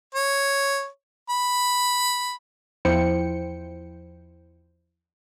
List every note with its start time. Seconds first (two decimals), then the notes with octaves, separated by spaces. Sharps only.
0.15 C#5
1.29 B5
2.85 E2 F3 E4 C5 G5 C#7